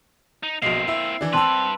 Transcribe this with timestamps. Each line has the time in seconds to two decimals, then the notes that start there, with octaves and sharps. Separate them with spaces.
0.43 D#4
0.62 A#1 B2 A#3 C4 D#5 C7
0.88 E4 E5
1.21 E3 D4
1.33 G2 C4 B4 A5 C6 E6